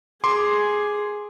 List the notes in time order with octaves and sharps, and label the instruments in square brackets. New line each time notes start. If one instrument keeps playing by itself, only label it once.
[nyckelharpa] G#4 [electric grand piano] C6 D6